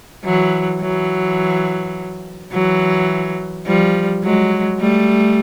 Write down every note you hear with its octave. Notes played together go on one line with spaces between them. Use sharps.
E3 F#3
E3 F#3
E3 F#3
F3 G3
F#3 G#3
G3 A3